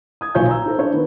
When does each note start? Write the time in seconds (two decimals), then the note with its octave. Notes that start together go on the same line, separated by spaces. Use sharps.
0.21 D#6 G#6
0.35 B1 A#2 C#5 G#5 G6
0.49 A#5 E6
0.65 D#4 A4 C5
0.79 D4 C#5
0.93 D#3 B3